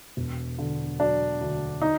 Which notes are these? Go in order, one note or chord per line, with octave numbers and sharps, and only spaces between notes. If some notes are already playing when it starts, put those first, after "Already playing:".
E1
D3
F#3 D4
D2
D#4